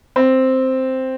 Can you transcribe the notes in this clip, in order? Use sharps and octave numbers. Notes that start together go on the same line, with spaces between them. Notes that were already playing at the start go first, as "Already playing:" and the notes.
C4